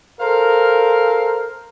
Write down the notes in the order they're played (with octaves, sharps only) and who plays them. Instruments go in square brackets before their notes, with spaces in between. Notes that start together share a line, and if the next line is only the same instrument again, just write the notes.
[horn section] A4 A#4 C5 F5